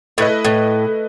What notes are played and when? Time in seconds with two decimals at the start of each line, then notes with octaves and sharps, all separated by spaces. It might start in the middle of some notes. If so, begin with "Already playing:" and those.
0.18 A2 A3 E4 B4 D#5
0.45 A2